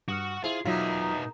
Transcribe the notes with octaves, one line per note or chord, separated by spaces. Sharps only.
G2 F#4 D#6 F6
E4 F4 G#4 C5
B2 F#3 A#3 D#4 F4 E5